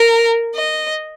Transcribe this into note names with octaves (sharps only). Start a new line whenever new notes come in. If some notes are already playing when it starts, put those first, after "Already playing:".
Already playing: A#4
D#5